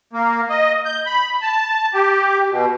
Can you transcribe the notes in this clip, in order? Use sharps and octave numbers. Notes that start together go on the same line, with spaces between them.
A#3
D#5
G6
B5
A5
G4
B2